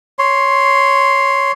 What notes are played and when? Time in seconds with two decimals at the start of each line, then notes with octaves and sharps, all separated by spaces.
0.19 C#5 C6